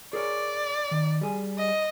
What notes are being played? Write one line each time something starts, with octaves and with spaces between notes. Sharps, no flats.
G#4 A#4 C#5 D5
D#3
G3 G#4
D#5